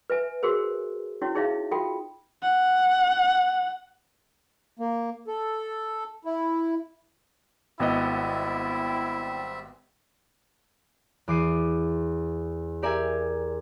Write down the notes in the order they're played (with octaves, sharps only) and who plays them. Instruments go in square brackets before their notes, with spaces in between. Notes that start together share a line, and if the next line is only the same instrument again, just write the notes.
[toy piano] B4 E5 G#5
F#4 G#4 A#4 C5
C#4 E4 F#4 C#5
D#4 G#4 C#5 E5 F5
F4 F#4 A4 G5
[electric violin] F#5
[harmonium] A#3
A4
E4
[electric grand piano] G#1 B3 D#5 [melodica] G3 C4 E5 [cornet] E4
[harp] E2 D6 C7 D#7
G4 A#4 D5 E5 G#5